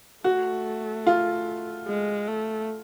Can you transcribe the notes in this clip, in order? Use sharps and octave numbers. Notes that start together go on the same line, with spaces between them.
A3 F#4
F4
G#3
A3